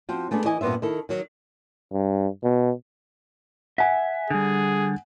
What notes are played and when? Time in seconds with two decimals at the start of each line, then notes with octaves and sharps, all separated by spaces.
0.09 F3 C4 F#4
0.31 G#3 A3 B3 D4 G#4
0.45 E3 E4 D#5 G#5
0.61 G2 A#2 B3 C5 E5
0.82 D#3 E4 A4
1.09 D#3 F#3
1.92 G2
2.44 B2
3.78 E5 F#5 G#5
4.30 D3 G3 G#4